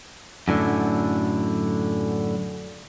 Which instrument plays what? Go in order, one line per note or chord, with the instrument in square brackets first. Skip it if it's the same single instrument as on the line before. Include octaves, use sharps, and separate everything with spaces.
[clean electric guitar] F#2 A2 D3